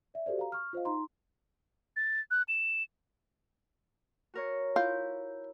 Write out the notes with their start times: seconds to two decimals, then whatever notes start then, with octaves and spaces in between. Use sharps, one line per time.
0.14 D5 E5
0.26 F#4 G4 A4 C5 D5
0.39 F5 A#5
0.52 C#6 F6
0.73 F4 C5 D#5 F5
0.85 D#4 A#5 C6
1.96 A6
2.31 F#6
2.48 E7
4.34 F#4 A#4 C#5
4.76 E4 F4 G6